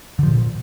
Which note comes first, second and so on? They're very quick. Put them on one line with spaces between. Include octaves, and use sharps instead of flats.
D3 F3 A#2